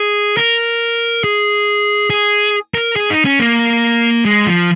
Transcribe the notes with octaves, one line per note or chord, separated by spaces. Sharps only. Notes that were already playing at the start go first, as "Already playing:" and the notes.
Already playing: G#4
A#4
G#4
G#4
A#4
G#4
D#4
C#4
A#3
G#3
F3